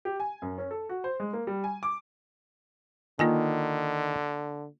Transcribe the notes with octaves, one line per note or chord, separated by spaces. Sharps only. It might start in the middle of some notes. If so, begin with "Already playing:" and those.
G4
G#5
F#2
C#4
A4
F#4
C5
G#3
A#3
G3
G#5
D6
D3 D#3 A#3 F4 G#5